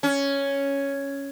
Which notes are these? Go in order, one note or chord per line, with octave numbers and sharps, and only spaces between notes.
C#4